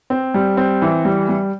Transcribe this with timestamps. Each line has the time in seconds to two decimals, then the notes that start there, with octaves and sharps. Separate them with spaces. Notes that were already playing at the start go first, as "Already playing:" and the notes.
0.10 C4
0.34 G3
0.57 C4
0.82 E3
1.05 G3
1.29 G3